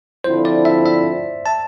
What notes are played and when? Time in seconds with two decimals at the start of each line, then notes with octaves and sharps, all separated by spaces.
0.24 D3 F3 C4 E4 C5
0.45 D5
0.65 E5
0.86 E5
1.46 A5